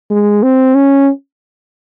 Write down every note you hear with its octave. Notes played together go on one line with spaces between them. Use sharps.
G#3
C4
C#4